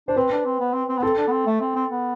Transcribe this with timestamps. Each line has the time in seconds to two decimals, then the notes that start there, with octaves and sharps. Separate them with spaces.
0.08 D4 C5
0.16 C4 B4
0.31 D4
0.45 C4
0.60 B3
0.73 C4
0.89 C4
0.98 B3
1.02 C4 A4
1.18 D4
1.27 B3
1.32 C4
1.46 A3
1.61 C4
1.75 C4
1.90 B3